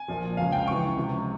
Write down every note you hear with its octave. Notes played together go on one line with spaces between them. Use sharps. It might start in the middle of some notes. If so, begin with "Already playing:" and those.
Already playing: G#5
A#1 A#2 F3
C#2 C#3 F3 F5
G5
C#2 C#3 E3 C#6
C#2 C3 F3